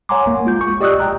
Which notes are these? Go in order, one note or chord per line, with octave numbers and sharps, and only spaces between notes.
C#5 F#5 G#5 A#5 C6 D6
A#3
G#3 F4 G6
C#6
G4 D5 D#5 D#6 E6 F#6
G5 A#5 D#6